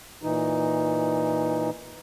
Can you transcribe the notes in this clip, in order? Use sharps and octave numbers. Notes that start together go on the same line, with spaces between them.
A#2 E3 D#4